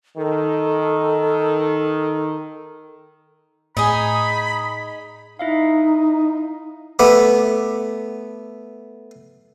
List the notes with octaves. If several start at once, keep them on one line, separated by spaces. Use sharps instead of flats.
D#3 A4
A2 D#4 G#4 B5
D#4 E4 E5 F5
A3 B3 B5 D6